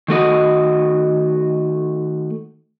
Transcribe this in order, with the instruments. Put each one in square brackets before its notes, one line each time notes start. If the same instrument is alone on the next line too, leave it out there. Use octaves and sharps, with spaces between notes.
[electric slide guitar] D#3 A3 F#4 D#5